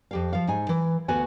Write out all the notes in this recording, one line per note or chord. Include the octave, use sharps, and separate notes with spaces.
F2 G4 F5
F3 F5
G#2 D#4 G#5
E3
D2 B3 F#4 G#5